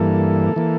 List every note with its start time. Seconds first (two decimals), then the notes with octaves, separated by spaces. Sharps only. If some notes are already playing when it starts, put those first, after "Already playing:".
Already playing: G2 E3 A#3 A4
0.56 E3 A#3